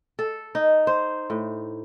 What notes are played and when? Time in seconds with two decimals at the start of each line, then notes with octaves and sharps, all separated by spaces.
0.19 A4
0.55 D#4
0.87 C5
1.30 A2